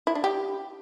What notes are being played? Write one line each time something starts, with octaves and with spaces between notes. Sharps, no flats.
E4
D4
G4